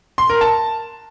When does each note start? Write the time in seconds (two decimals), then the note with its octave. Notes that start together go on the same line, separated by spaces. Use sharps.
0.18 C6
0.30 A#4
0.41 A5